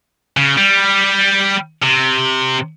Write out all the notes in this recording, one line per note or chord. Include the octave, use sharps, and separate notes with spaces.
C#3
G3
C3